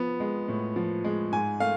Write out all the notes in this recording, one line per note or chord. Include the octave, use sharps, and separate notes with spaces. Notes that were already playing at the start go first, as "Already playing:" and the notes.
Already playing: F3 B3
G#3
A2
F3
G#3
G#2 G#5
A3 F5